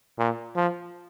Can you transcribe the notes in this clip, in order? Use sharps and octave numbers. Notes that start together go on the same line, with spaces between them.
A#2
F3